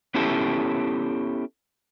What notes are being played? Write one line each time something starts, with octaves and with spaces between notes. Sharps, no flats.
B3 C#4 E4 G4 A4